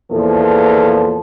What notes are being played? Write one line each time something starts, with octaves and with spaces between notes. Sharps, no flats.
E2 A#2 F3 A4